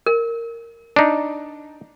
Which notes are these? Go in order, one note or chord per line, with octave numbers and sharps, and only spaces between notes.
A#4
D4 D#4